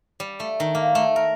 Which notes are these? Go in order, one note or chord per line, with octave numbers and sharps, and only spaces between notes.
G3
A3
D#3
A#3
A3
A#4